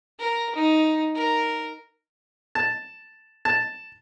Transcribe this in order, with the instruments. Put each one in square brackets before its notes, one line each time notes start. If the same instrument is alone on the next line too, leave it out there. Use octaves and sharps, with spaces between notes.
[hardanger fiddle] A#4
D#4
A#4
[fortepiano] A5
A5